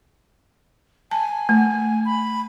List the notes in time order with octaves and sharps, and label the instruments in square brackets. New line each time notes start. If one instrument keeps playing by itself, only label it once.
[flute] G#5 [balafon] A5
[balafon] A3
[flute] B5